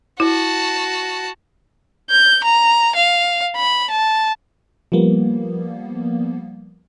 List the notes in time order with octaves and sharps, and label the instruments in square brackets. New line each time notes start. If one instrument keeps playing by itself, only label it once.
[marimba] E4 [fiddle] F#4 A5
[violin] G6
A#5
F5
B5
A5
[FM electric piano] F3 G3 A#3 B3